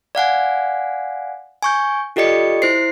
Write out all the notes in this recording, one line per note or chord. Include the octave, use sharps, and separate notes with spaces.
D5 F5 F#5 G#5
G#5 C#6 G6
F4 G4 A4 D5 D#5 C#7
E4 C5 C7